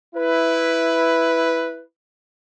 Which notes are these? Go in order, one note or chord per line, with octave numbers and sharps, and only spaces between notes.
E4 B4